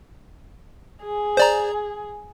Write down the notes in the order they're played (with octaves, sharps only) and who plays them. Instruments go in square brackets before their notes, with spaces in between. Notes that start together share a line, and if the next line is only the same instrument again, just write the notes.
[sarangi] G#4
[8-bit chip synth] C5 D5 A#5